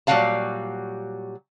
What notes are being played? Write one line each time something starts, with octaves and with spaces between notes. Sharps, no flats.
A#2 F#3 G3 F#4 F5 A5